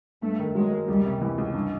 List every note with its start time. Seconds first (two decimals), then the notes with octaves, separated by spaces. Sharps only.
0.22 G2 A3
0.39 D#3
0.55 F#3 G#3
0.71 A#3
0.88 C#2 G3
1.04 C3
1.22 E3
1.38 C#2
1.54 G2